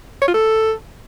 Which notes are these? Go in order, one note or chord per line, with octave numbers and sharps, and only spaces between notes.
C#5
F4
A4